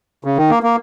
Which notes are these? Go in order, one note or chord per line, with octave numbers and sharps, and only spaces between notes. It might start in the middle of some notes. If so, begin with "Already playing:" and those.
C#3
D#3
A#3
A#3